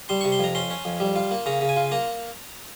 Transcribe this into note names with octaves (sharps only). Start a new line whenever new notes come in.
G3 C6
C3 C#6
C6
F2 A#5
C#4 C6
C#4
F2
G3
F4
A#3
C#3 A#5
C#3
G#5
F4
A#3 A#5